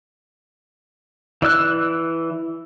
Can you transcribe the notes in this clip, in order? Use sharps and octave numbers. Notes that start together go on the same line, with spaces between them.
E3 D5 E6 F#6